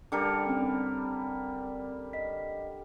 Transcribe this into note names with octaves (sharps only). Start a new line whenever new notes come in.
D3 G3 A#4 D6 C#7
C4 C#4
D#5 B6